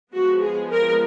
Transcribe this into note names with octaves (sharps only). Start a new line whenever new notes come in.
F3 G#3 B3 F#4
G#4
A#4